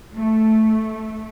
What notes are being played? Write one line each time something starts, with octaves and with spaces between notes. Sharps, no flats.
A3